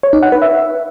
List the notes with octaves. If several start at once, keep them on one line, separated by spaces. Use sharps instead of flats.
C#5
D#4
F#5
B4
E5